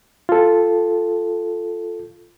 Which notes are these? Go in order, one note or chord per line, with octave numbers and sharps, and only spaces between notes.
F4 A4